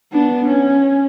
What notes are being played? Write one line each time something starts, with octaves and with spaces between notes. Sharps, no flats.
B3 D4
C#4